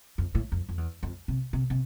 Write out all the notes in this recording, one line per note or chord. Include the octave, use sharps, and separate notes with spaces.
F2
A2
F2
F2
E2
F2
C3
C3
C3